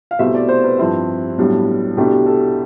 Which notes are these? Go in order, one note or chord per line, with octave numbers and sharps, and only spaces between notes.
F5
C2 B2 A3 C4 E5
D5
C5
B4
G2 F3 C4 E4
B1 A2 G3 D4
C2 B2 A3 D4 G4
A4